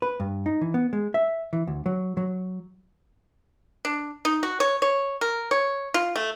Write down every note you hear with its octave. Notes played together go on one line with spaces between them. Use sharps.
B4
G2
D#4
E3
B3
G#3
E5
E3
D2
F#3
F#3
D4
D#4
F#4
C#5
C#5
A#4
C#5
F4
A3